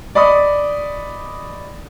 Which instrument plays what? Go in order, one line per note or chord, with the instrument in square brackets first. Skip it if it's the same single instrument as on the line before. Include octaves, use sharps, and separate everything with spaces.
[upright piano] D5 D#5 B5 C#6 D#6